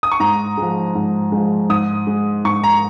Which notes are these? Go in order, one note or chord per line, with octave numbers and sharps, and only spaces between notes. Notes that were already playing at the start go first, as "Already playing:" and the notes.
D#6
C#6
G#2 A#5
F3 G#3
G#2
F3 G#3
G#2 D#6
G#3
G#2 C#6
A#5